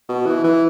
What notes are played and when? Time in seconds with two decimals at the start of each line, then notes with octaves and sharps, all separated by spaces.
0.09 B2
0.26 E3
0.44 E3